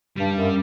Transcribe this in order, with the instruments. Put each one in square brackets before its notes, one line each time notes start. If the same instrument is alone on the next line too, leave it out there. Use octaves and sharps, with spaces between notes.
[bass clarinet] G2 [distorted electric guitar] G3
[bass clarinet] F#2